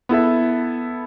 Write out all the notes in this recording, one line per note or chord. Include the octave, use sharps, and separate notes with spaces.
B3 E4 A4 E5